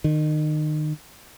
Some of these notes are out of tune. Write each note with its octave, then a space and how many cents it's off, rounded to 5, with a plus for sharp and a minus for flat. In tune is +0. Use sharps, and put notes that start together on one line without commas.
D#3 -30